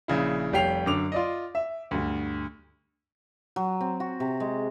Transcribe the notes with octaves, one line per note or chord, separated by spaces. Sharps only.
A#1 C#3 E4
F1 G3 C#5 G5 C7 F7
F#2 D3 D6 F7
F4 D5 D#5
E5
D2 G2
F#3
C4
F#4
C3
G#3